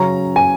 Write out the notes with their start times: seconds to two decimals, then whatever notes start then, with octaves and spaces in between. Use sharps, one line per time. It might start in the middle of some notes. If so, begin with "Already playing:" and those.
Already playing: C#3 F#3 C#4 A#5
0.36 G#5